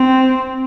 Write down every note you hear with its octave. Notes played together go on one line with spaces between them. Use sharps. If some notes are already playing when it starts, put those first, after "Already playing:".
Already playing: C4